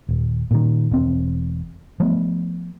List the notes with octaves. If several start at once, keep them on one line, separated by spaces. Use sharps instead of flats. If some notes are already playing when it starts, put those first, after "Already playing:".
D#1
A#2 D#3
E1 C4
F3 A3 B3